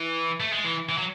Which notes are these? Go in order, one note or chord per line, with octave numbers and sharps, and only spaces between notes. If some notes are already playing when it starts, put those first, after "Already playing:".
Already playing: E3
A3
G#3
E3
E3
F#3